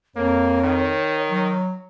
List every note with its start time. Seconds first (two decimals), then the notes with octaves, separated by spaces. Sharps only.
0.16 F2 A#3 C#5
0.63 D#3
1.30 F#3